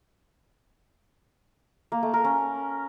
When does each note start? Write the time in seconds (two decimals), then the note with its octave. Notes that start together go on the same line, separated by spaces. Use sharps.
1.92 A#3
2.03 A3
2.14 A#4
2.24 C#4